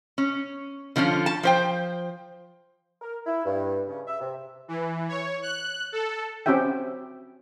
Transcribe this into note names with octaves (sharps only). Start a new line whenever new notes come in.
C#4
D3 F3 B3 C#4 F4
A5
F3 C5 G5
A#4
E4
G2
C#3
E5
C3
E3
C#5
F#6
A4
C4 C#4 F#4 G4 E5 G5